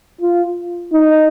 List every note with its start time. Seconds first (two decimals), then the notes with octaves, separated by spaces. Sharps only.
0.21 F4
0.93 D#4